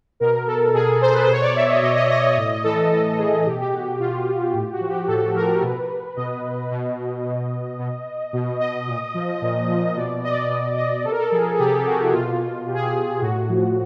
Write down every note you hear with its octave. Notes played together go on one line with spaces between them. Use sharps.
B2 A#4
A4
B2 G#4
C5
B4
C5
B2 C#5
D5
E5
D#5
B2 D#5
D#5
D#5
D5
A2 D#5
E3 A4
A2 A4
E3 G#4
B2 G4
G4
F#4
B2 F4
A2 G4
F#4
F3
G4
A2 A4
F3 A#4
B2 B4
B2 D#5
B2
B2
B2
B2
D#5
A#2
F3
A#2
F3
B2 D5
D#5
D5
D#5
B2 D#5
D#5
C3 A4
A#4
A4
F3 G#4
G#4
C3 G4
F3 F#4
E4
B2 F4
B2 G4
G#4
G4
A2 F#4
F3